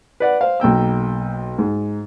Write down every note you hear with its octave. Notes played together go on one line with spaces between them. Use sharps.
B4 D5 F#5
C5 F5
B1 A#3 G5 E6
G#2